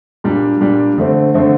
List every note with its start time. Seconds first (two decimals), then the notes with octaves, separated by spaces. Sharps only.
0.24 A#2 G3 D4
0.61 A#2 G3 D4
0.98 D3 A3 C4
1.34 D3 A3 C4